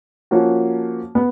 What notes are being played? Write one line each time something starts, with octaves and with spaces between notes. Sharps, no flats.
F3 A#3 C#4 F#4
B3